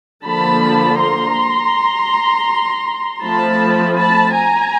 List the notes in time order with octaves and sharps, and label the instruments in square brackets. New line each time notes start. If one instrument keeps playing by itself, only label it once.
[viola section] D3 F3 A#3 A5 B5
A#5 C6
F3 A3 C4 A5 B5
A5 B5
G#5 A#5